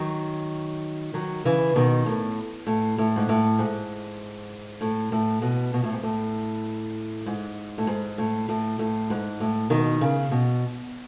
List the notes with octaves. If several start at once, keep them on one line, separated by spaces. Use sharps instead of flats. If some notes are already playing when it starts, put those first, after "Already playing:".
Already playing: D#3 F#3
D#3 F#3
C#3 E3
B2 D#3
A2
A2
A2
G#2
A2
G#2
A2
A2
B2
B2
A2
G#2
A2
G#2
A2
G#2
A2
A2
A2
G#2
A2
B2 D#3
C#3
B2